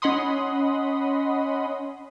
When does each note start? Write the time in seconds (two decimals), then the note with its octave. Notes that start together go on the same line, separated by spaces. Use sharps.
0.02 C#4 D#5 F#5 B5 C6 D#6